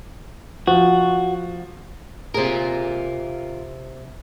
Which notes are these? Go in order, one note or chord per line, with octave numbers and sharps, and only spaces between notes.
F3 F#4
C3 F4 G#4 A#4